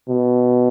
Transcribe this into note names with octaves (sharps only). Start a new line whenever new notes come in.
B2